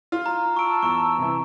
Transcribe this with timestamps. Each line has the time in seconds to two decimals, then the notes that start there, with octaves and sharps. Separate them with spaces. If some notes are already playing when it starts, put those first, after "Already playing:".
0.12 F4
0.26 A#5
0.56 A5 C#6 E6 D7
0.82 E2 A#5 C#6
1.18 C3 E3